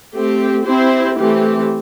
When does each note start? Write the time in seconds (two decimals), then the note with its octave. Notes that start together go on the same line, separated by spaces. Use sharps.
0.13 A3 C4 G4
0.65 C4 E4 G4 C5
1.17 E3 A3 C4 G4